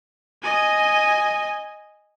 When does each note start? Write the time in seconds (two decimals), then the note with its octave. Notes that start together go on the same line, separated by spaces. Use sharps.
0.43 D#5 G#5